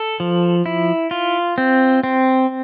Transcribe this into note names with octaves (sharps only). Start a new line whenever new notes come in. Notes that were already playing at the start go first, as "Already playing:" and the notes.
Already playing: A4
F3
E4
F4
C4
C4